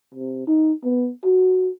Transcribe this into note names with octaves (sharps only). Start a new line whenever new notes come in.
C3
D#4
B3
F#4